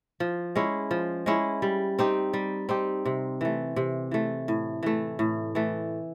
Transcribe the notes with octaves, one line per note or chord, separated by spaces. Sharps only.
F3
G#3 C#4 E4
F3
G#3 C#4 E4
G3
C4 D#4 G4
G3
C4 D#4 G4
C3
E3 A3
C3
E3 A3
A2
E3 A3
A2
E3 A3